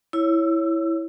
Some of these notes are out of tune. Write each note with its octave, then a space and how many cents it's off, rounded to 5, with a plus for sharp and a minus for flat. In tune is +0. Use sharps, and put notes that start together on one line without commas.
E4 +0 C#5 +0 E6 +25